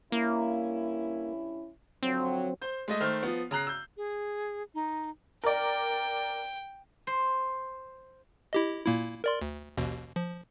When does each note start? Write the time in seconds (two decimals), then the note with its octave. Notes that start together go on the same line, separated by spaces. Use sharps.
0.12 G2 A#3 C#4 E4
2.03 D3 F3 F#3 C4
2.62 C5 G6
2.88 G#3 A3 D#5
3.00 D#3 A3 C5 F6
3.23 F3 B3
3.51 C#3 A#5 F#6 C7
3.67 E6 G6
3.97 G#4
4.74 D#4
5.44 A#4 D5 G5
7.07 C5
8.53 E4 G4 D#5
8.87 A#2 A#3 E4
9.24 A#4 D5 C6
9.42 D2
9.77 A1 D#2 B2
10.16 F3